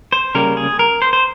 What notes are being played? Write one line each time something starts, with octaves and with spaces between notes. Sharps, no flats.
C5
C#3 G3 A#3 A#4
G#4
A#4
C5
C5